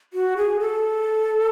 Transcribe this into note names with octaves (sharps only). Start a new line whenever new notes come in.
F#4
G#4
A4